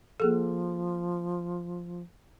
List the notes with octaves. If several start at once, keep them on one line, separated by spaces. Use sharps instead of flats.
F3 A#3 G#4 A4